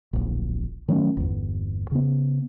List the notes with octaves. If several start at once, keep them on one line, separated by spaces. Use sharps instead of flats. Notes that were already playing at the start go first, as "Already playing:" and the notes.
D1 A#1
D#3 F#3 A3 C#4
G1 E2
C#3 B3